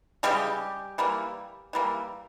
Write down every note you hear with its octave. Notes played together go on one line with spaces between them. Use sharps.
C#3 E3 G3 G#3 G4
E3 G3 A#3
E3 G3 A#3